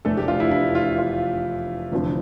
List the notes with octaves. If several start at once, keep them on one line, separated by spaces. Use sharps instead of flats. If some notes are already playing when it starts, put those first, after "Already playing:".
F1 E2 E3 A3 D4 A4
G4
F4
E4
E4
F4
F4
F1 E2 D3 F3 C4